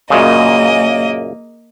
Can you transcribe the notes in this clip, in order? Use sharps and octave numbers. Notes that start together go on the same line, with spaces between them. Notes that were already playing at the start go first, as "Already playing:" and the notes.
F#2 A#2 C#3 A#3 D#5